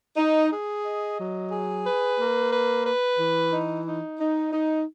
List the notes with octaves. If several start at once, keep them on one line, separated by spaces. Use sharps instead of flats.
D#4
G#4
D#5
F#3
G#4
B4
A#3
B4
B4
E3
D#4
D#4
D#4
D#4